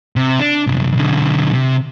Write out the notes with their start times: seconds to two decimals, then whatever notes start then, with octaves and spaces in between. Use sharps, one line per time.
0.16 C3
0.40 D4
0.67 C2 F#2
0.94 B1 D3
1.53 C3